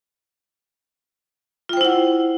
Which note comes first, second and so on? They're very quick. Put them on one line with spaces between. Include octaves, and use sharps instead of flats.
F4 G5 C5 E4 F#5